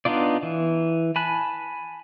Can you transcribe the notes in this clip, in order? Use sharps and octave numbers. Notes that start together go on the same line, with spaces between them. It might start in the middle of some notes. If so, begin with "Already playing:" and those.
B3 D4 D#4 F4 D5
E3
G#5 A5 B5 F#6